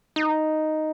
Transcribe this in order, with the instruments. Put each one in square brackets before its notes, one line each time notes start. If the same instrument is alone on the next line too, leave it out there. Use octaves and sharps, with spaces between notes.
[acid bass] D#4